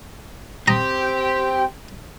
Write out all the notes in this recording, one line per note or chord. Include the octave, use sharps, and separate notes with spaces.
C4 G4 G5 A#5 D#6